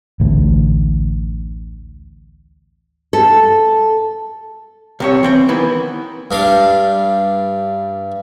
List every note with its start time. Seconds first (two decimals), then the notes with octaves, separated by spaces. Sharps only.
0.20 A1 D2
3.13 A4
5.00 C2 C3 C#5
5.23 E3 C4 G5
5.48 D#3 E3 B3
6.31 G2 D4 F5